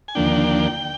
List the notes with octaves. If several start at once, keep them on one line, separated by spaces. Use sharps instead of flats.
G#5
D#2 D3 F3 A#3 D4 G5